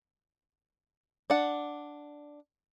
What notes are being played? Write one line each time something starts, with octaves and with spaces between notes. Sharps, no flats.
D4 F#5